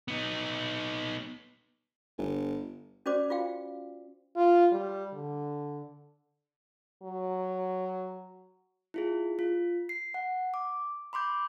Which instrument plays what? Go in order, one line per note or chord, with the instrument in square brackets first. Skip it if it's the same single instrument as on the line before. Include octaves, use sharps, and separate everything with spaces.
[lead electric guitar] B3 D#4
[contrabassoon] G1
[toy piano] C#4 F#4 C5 D5 D6
F4 F#4 F5 G5
[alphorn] F4
G3
D3
F#3
[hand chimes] E4 F4 G#4
F4
C7
F#5
D6
B5 C6 D6 G6